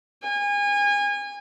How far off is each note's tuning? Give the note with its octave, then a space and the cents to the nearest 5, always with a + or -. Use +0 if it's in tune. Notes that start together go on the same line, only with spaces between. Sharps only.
G#5 -30